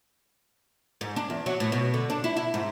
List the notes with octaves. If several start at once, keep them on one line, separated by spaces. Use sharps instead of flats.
G#2
D4
E2
F#3
A2
B2
D3
D4
E4
E4
G#2